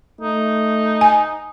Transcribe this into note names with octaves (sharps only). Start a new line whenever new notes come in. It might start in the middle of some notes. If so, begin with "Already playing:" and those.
A3 D#4
G#5